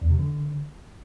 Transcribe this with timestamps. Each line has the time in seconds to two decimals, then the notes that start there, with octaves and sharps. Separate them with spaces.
0.01 E2
0.10 C3
0.19 D3